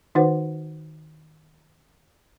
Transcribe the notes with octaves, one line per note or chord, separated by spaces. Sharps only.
D#3 D#4 F#4 B4 C5 F#5